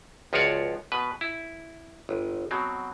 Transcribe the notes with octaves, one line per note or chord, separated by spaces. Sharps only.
C#2 F3 F4 F#4 C#5 D5
B2 B4
E4
G1
B2 F#3 C4